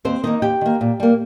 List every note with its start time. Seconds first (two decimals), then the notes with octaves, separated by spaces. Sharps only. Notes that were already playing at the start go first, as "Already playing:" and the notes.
0.05 D#2 C4 C5
0.24 D#3 A#3 D#4 D#5
0.42 D#2 G4 G5
0.61 D#3 A#3
0.81 A#2
1.00 G3 A#3